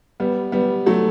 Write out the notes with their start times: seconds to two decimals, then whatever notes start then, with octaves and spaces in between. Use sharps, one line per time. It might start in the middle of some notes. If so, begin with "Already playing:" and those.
0.20 G3 B3
0.52 G3 B3
0.86 F#3 A3